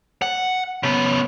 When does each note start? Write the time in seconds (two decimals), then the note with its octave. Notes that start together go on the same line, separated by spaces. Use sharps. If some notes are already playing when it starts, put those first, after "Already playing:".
0.22 F#5
0.83 C#3 B3